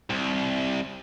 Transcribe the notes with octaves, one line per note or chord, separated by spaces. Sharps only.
C2